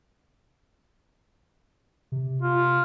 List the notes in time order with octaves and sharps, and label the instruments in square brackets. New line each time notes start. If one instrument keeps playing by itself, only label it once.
[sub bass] C3
[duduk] F4